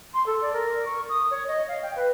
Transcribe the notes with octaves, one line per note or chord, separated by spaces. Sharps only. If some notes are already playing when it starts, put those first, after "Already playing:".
C6
A4
D5
A#4
C#6
D#6
C#5
D#5
F5
G5
B4